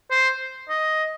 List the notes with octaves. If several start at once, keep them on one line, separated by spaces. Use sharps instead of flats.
C5
D#5